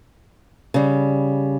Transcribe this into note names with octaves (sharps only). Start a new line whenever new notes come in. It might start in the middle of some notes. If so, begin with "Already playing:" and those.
C#3 G3